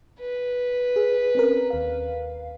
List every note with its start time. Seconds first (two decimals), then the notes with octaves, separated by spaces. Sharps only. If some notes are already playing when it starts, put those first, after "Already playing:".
0.20 B4
0.96 G#4
1.35 C4 C#4 A#4
1.70 D#2 F5